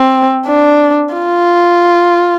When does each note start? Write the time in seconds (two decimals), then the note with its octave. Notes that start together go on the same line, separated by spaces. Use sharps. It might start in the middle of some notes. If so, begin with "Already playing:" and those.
Already playing: C4
0.47 D4
1.14 F4